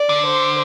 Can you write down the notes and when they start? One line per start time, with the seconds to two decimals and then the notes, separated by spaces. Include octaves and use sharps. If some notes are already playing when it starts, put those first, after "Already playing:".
Already playing: D5
0.09 D3
0.25 C5